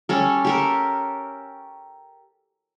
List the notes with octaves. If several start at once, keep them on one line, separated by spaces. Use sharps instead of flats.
G3 C#4 A4
G4 A4 A#4